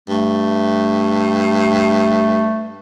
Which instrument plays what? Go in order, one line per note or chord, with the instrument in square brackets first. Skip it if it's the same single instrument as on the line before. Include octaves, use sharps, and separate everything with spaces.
[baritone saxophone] G2 [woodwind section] A3